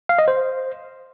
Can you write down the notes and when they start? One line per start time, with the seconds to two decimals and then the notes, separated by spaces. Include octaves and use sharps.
0.09 F5
0.18 D#5
0.28 C5